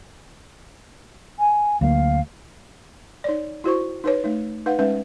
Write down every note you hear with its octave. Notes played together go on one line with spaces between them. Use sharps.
G#5
D2 F#3 A#3 F5
D#4 C#5 D5
E4 F#4 C5 C#6
D#4 B4 C#5
A3 D#4
D#4 B4 F5 F#5
G#3 C#4 D#4 B4 E5